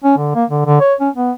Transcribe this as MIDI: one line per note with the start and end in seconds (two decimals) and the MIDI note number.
0.04 0.14 61
0.17 0.33 50
0.35 0.45 58
0.49 0.65 50
0.66 0.77 50
0.80 0.94 73
1.00 1.09 61
1.15 1.32 59